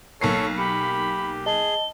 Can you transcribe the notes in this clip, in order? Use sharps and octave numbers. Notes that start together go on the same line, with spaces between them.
B1 A#3 A4 C#5 C7
G4 B5 C#7
G#4 D#5 A5 G7